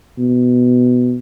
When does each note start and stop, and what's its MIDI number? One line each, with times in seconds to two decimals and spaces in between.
0.18 1.18 47